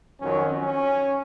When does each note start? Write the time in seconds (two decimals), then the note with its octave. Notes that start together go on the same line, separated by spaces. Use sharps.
0.21 F2 D#3 F#3 C#4
0.60 C#4